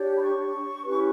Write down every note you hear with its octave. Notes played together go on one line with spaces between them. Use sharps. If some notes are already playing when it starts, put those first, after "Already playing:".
Already playing: D4 G4 C#5
B5
C#6
C#4 E4 G4 B4